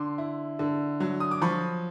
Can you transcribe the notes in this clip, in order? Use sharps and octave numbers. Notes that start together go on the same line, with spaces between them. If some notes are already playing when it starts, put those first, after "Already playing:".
Already playing: D3 C6 D6
E4
D3
F#3
D#6
D6
F3 B5 C#6